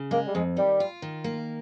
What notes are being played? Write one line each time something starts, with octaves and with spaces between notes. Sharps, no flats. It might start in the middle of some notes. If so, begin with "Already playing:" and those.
Already playing: C#3
G#3 A#3
G3
F2 G#3
D#3 G3
F4
D#3
A#3